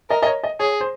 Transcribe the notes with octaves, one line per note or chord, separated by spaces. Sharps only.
A#4 D#5
D#5
C#5
D#5
G#4 C#5
C5